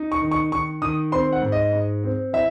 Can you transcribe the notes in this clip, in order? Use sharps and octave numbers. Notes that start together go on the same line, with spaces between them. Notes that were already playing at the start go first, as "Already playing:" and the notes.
Already playing: D#4
C#6
D#3
C#6
D#3 C#6
D#3 D#6
C4 C6
F#5
G#2
D#5
G#2
C4
E3 E5